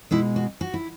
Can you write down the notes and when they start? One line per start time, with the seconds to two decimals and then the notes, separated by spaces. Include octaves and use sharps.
0.11 B2 G#3 E4
0.36 F#4
0.61 F#4
0.74 E4